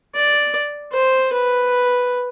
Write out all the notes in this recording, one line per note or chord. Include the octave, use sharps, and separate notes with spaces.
D5
C5
B4